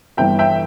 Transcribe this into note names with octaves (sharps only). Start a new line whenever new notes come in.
G1 G2 E3 E5 G5
E5 G5